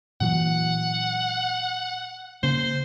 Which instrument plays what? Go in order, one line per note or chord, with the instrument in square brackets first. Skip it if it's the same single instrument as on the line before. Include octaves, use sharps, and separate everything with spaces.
[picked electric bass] A#2 E3 F#3 [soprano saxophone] F#5
[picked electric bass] C#3 A#3 [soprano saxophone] C5